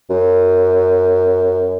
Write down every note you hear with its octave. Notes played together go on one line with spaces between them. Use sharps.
F#2